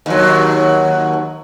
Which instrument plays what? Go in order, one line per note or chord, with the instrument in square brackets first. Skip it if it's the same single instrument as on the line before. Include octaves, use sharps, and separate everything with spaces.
[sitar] D#2 F#3